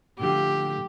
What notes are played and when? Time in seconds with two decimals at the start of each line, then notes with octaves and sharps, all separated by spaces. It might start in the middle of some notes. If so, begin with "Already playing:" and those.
0.19 A2 D3 F3 G4